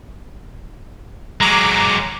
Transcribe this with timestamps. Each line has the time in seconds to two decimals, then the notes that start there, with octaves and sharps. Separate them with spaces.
1.41 F#3 G#3 A#5 D6